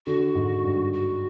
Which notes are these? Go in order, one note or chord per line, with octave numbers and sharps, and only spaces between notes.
D3 F#4
G#2
G2
F#4